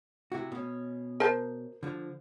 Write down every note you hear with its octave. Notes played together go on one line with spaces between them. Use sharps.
C3 E4 F#4
B2 C#4
A#4 C5 A5
D3 F3